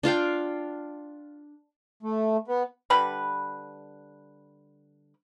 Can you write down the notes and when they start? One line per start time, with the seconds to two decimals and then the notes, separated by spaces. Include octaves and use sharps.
0.03 D4 F4 F5 G5
2.03 A3
2.48 B3
2.90 D3 G3 B4 B5